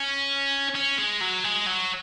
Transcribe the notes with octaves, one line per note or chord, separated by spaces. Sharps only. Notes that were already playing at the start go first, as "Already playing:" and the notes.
Already playing: C#4
C#4
G#3
F#3
G#3
F#3